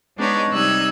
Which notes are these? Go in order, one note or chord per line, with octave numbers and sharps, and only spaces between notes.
G#3 B3 D4 D#4 C#5
C3 G3 D#4 E6 F#6 G#6